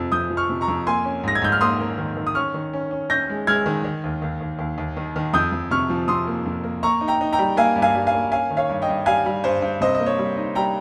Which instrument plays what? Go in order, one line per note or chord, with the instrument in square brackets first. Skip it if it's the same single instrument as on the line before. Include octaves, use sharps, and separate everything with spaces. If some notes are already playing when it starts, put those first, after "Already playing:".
Already playing: [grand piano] F2 C3 F3
F2 D#6 G6
F3
C#6 F6
C3
A#5 C#6
F2
A#3 G#5 C6
C#4
G#2 A#6
G#6
G#2 G6
F6
A#3 C6 D#6
A#3
D#3
D#3
D#6
C#4 C#6 F6
D#3
C#4
C#4
C#4 G6 A#6
G#3
G#3 F6 G#6
D#3
D#3
D#2
D#2
D#2
D#2
D#2
D#3
D#3
F2 D#6 G6
F2
C3 C#6 F6
F3
C3 C6 D#6
A#3
F2
A#3
A#3 A#5 C#6
D#4
G5 A#5
D#4
G5 A#5
G3
A#3 F5 G#5
G2
F5 G#5
G3
F5 G#5
A#3
C#4 F5 G#5
D#3
C#5 F5
G2
D#5 G5
G2
G3 F5 G#5
G3
G2 C5
G2
C3 C5 D#5
A#3 D#5
C#5
G3
D#4
G3 G5 A#5